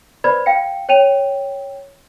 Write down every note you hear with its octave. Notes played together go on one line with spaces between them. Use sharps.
B4 C5 D5 B5 G#6
F5 G5 C#7
C#5 G5 D#7 F7